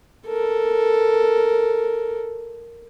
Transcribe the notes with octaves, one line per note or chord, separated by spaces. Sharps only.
A4 A#4